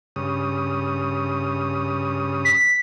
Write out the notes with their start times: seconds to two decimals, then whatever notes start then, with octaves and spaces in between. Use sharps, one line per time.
0.16 G2 C#3 D#6
2.45 B6